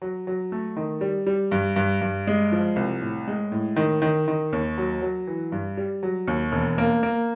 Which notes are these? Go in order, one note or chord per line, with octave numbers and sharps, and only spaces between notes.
F#3
F#3
A3
D#3
G3
G3
G2
G2
G2
G#3
F3
C2
A2
G#3
A2
D#3
D#3
D#3
D#2
F#3
F#3
E3
G2
G3
F#3
D#2
E1
A#3
A#3